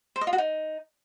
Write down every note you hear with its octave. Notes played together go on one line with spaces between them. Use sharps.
C5
D#5
F4
F#4
D#4